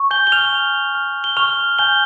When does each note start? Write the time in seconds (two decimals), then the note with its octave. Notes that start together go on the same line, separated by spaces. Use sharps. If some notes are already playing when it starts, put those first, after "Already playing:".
Already playing: C#6
0.11 G#5 G6 G7
0.27 G7
0.32 F6 F7
0.53 G#5
0.95 F6
1.24 G7
1.37 C#6 F6 F7
1.79 G#5 G6 G7